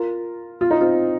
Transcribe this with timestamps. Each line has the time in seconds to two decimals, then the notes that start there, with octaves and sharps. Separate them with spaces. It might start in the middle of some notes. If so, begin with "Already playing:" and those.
Already playing: F4 A#4
0.61 F4
0.71 D#4
0.81 C4 F4